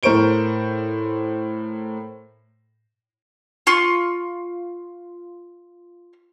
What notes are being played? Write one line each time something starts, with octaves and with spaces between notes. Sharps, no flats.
A2 A#4 C5 C#6 D7 G7
F4 C6 C#6